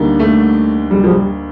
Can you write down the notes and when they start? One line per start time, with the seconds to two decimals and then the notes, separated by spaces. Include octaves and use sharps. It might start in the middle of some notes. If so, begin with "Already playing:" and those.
Already playing: D2 D3 G3 A#3 D#4
0.19 A3
0.91 G3
1.04 F3
1.09 G3